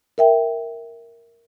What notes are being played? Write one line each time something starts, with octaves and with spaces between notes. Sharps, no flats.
A#4 E5 G5